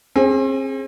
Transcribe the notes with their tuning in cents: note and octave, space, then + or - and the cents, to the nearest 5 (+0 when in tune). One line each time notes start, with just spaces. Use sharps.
C4 +40 G#4 +0